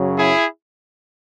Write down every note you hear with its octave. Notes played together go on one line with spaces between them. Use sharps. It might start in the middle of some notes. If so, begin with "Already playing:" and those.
Already playing: F#2 C#3 F#3
E4 G#4